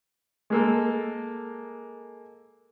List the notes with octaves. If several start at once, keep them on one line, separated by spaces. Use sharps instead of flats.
G#3 A#3 A4